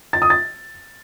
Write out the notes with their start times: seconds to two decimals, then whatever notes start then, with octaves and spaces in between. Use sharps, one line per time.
0.13 A6
0.22 D#6
0.30 A6